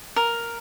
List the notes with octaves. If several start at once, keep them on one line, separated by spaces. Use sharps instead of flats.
A#4